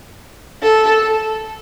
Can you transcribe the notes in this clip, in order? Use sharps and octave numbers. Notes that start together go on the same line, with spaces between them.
A4